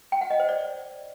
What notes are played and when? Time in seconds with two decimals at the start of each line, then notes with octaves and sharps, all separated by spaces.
0.12 G5
0.21 F#5
0.30 D#5
0.40 C5
0.49 D5